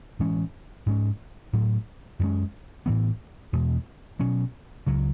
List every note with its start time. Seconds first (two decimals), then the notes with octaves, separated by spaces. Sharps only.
0.19 A2 E3 G#3 C#4
0.86 G#2 G#3 C#4
1.53 A2 F#3 A3
2.19 F#2 E3 G#3 C#4
2.86 A2 E3 B3
3.53 E2 B2 G#3
4.19 B2 F#3 C#4
4.87 C#2 C#3 F#3